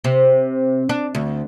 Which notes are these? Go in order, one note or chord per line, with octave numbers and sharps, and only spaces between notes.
C3
D4
D2